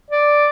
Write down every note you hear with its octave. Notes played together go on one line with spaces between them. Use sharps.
D5